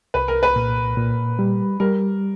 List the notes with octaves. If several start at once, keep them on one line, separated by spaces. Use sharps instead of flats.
C2 B4
A#4
B4
A#2
A#2
G3
G3 A#4